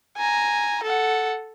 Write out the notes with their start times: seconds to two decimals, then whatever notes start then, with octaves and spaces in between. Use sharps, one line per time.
0.17 G#5 A#5
0.83 A4 F#5